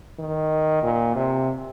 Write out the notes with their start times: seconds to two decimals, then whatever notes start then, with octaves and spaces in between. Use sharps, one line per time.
0.19 D#3
0.83 A#2
1.15 C3